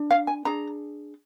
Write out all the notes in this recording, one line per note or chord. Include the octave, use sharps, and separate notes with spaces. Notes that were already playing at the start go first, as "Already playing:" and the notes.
Already playing: D4
F5
G#5
D4 G#4 A#5